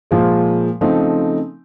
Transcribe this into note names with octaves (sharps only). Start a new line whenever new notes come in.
A#2 F3 G#3
C#3 F3 A3 C4 D#4